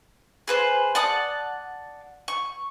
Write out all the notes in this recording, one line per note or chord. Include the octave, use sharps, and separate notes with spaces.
G#4 B4 C5
D5 F#5 A5 D#6
C#6